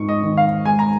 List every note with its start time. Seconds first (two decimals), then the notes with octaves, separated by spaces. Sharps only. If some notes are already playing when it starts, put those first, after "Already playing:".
Already playing: G#2 D#4 C#6
0.09 D#5
0.23 D#3
0.37 F5
0.65 G#3 G#5
0.79 A#5